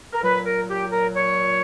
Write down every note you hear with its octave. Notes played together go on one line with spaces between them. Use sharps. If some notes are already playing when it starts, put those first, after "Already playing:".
A#4
A#2 F#3 B4
A#4
G4
A#4
C#5